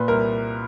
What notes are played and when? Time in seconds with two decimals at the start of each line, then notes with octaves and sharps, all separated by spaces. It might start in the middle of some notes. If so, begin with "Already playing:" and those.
Already playing: A#2 B4
0.08 C2 A#4